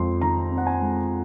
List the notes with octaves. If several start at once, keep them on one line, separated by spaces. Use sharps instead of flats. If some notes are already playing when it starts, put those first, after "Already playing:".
Already playing: F2 G#3 C4 C6
D#3 A#5
C4
F#5
G#5
G#3